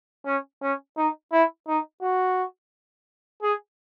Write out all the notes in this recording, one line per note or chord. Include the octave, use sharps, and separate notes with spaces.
C#4
C#4
D#4
E4
D#4
F#4
G#4